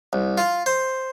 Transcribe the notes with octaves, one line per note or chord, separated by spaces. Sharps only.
C2
F4
C5